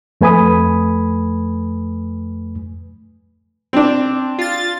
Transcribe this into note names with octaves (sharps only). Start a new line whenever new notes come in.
F2 A3 B4 G#5 B5 D#6
C4 D4
F4 A6